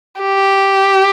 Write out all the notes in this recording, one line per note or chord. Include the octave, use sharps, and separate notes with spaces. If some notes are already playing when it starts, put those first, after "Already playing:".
G4